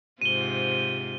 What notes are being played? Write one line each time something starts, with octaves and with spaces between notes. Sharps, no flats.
G#2 C3 F4 D#7 G7